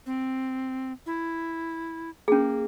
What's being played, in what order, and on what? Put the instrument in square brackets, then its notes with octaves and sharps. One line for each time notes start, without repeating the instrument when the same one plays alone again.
[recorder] C4
E4
[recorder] A#3 [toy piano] C#4 G#4